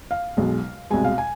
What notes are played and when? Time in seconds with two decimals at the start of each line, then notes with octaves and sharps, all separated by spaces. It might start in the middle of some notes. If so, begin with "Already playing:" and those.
0.11 F5
0.37 B1 B2 G#3
0.90 C2 B2 G#3 G#5
1.04 F5
1.18 G#5